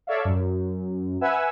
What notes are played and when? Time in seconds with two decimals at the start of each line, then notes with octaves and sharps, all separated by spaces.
0.07 A4 C#5 D5 E5 F5
0.25 F#2
1.21 B4 E5 F#5 G#5 E6